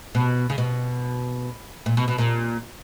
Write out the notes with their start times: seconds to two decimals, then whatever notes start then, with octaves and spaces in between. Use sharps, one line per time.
0.15 B2
0.50 C#3
0.58 B2
1.86 A#2
1.97 B2
2.08 B2
2.18 A#2